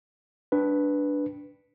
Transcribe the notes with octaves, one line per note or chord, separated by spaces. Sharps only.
D4 B4